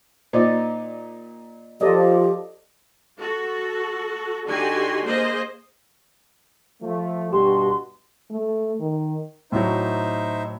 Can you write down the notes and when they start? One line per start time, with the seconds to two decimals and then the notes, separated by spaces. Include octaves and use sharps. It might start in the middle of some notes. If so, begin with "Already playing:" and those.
0.33 A#2 D#4 C5 D5
1.81 F3 G4 A4 D5 D#5
3.19 F#4 A4
4.46 D3 D#4 F#4 G4 G#5 C6
5.06 A#3 G#4 C5 D#5
6.82 F3 A3
7.33 G2 B2 F#4 G4 C6
8.31 A3
8.80 D#3
9.52 A2 F#3 D#4 C5 E5